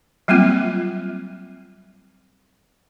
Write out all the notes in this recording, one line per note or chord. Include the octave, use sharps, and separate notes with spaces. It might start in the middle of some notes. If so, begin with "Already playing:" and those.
F#3 G3 A#3 C4 F4